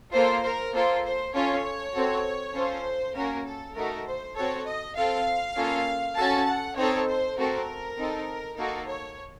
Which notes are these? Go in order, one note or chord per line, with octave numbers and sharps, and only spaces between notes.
A#3 F4 A4 C5
A#4
A#3 F4 A4 C5
C5
C#4 F4 A4 C#5
C4 F#4 A4
C#4 F4 A4 C5
A#3 C#4 F#4 A#4
A4
A3 D#4 F#4 A4 A#4
C5
C4 F#4 A4 C#5
D#5
C4 F4 A4 F5
A#3 C#4 F4 A4
C#4 F#4 A4 A5
F#5
C4 D#4 A4 C#5
C5
A3 C4 F#4 A4 A#4
C4 D#4 A4
A#3 D#4 F#4 A4 A#4
C#5